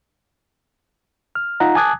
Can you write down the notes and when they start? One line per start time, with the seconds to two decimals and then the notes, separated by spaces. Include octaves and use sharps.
1.35 F6
1.60 D#4 F4 F#5 A#5
1.75 G#5 A5 D6 D#6 F#6 G#6